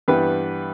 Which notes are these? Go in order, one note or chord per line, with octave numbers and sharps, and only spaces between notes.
G2 E3 G3 B3 B4